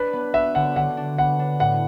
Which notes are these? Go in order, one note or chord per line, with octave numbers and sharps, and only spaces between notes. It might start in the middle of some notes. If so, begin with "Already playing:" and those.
Already playing: D4 B4
B3
F#4 E5
D3 F#5
D3 F#5
D4
B3 F#5
D4
A2 F#5